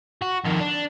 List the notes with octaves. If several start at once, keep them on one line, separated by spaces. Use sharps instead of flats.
F#4
F2 D#3
D4